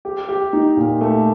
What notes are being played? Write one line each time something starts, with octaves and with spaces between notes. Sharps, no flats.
G4
G4
D#4
A#2
A3